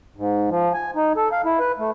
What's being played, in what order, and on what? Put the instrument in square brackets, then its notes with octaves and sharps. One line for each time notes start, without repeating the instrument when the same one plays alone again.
[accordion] G#2
F3
G#5
D#4
A4
F5
E4
B4
A3